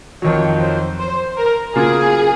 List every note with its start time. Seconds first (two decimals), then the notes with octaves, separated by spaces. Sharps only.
0.22 F2 D#3 F#3 C#5
0.61 C5
0.99 C5
1.37 A#4
1.75 C#3 F#3 A#3 F4 G#4